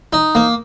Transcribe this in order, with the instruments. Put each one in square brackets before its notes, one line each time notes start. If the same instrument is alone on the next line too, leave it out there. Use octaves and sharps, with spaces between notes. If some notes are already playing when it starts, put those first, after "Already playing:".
[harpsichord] D#4
A#3